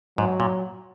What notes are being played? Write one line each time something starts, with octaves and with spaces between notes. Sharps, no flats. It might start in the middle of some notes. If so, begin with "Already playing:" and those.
G#2 F#3
A#2